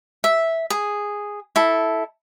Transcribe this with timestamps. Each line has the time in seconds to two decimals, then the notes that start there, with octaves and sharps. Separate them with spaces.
0.24 E5
0.70 G#4
1.56 E4 A4